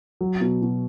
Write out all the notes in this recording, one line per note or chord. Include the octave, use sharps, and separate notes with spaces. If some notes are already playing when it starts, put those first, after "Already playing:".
F#3
B2
B2